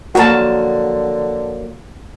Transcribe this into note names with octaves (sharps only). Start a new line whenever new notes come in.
D3 F3 F#3 A#3 F#4 A#4 F#5 A5